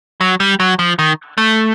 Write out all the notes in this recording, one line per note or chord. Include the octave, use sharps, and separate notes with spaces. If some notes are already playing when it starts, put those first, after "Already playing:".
F#3
G3
F#3
F3
D#3
A3